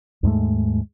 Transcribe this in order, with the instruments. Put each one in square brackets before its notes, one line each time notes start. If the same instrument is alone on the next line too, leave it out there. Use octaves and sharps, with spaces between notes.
[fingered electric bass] D#2 G#2 G#3 A3